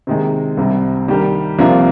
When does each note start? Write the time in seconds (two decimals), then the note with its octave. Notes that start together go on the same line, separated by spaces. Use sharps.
0.07 C3 D#3 G#3
0.57 C2 C3 G3
1.08 D#3 G3 D4 G4 A#4
1.59 C2 C3 F3 A#3 D4